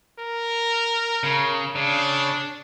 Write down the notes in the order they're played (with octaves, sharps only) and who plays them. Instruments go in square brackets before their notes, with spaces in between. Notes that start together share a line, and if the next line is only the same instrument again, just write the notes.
[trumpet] A#4
[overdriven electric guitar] C#3
[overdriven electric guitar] C#3 [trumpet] D4